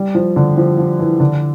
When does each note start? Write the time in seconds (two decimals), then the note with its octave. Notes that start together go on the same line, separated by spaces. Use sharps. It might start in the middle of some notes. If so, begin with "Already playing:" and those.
Already playing: G3
0.15 F3
0.36 D3
0.57 F3
0.78 F3
0.99 E3
1.20 D3